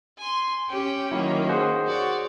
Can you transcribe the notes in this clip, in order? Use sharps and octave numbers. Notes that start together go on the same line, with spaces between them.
G#5 C6
C#4 G4 G5
D#3 F#3 A#3 E4
G#4 C5 F#5
F#4 C#5 D5